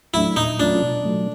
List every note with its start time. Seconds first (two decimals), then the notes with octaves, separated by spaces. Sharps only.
0.14 F#3 A3 D4 E4
0.36 A#2 D#4
0.59 F#3 A3 C#4 D4 F4
0.82 B2
1.05 F#3 A3